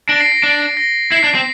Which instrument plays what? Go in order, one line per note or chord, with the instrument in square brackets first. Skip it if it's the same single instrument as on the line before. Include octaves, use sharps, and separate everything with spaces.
[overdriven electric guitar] D4 [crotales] A#6 D7
[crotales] C7
A#6
[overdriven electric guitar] D4
[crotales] A#6
[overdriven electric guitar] E4 [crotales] C7
[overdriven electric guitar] D4
C4